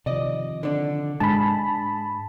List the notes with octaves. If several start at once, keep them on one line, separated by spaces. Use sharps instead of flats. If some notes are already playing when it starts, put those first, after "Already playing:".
C3 D#3 F3 D5 D#5
D3 D4
G#2 G#3 D4 A5 B5